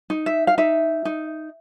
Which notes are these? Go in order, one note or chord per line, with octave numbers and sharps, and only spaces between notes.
D#4
E5
F5
D#4 E5
D#4